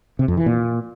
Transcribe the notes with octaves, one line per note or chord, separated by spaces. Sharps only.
C3
F2
E3
A#2